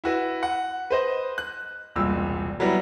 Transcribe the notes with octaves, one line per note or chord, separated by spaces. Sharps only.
E4 F#4 B4 E5
F#5
B4 C5 D#5
F#6
E1 C2 A#2 E6
F#3 G3 B3 E4